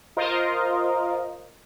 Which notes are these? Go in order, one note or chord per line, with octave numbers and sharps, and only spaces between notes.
F4 A#4 C5 D#5 F5